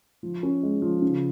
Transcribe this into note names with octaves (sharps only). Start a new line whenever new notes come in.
F3
C#4
G#3
F3
C#3